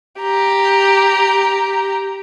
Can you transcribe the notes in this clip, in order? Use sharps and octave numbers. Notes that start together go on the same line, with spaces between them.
G4 A#5